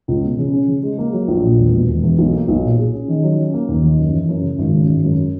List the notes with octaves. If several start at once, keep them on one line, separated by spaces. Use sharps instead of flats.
C#2
B2
C#3
C#4
C#3
G#3
A#3
F#3
A#1
A#2
E1
B2
E1
E2
B1
A#3
B1
A#2
G#4
C#4
D#3
F#3
C#4
A#3
D#2
D#3
F#2
E3
F#2
C#3
G#1
C#3
G#1
F#2